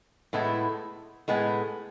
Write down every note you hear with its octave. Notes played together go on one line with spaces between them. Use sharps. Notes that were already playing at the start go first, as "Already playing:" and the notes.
A2 G#3 B3 E4 A4
A2 G#3 B3